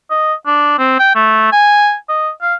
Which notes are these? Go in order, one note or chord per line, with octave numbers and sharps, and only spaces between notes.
D#5
D4
C4
G5
A3
G#5
D#5
F5